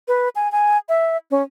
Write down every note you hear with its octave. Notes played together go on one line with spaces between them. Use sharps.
B4
G#5
G#5
E5
C#4